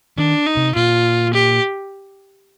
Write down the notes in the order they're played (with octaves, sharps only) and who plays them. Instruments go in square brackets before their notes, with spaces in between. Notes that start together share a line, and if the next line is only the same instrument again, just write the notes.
[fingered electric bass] D#3 [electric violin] D4
[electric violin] D#4
[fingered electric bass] C3
[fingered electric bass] A#2 [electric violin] F4
[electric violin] G4